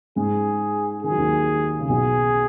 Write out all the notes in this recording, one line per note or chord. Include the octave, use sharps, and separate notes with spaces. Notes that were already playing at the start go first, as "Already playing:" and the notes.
G#2 G#3 G#4
D#3 G#4
F#3
D#2 D#3
C#3
B1 B2 G#4